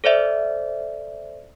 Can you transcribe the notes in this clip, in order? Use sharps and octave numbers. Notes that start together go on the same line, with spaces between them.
A4 C5 D5 E5